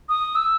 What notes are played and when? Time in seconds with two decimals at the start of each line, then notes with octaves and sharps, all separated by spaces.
0.09 D#6
0.35 E6